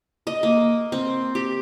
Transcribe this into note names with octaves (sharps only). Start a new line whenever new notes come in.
D#5
A#3
C4
G4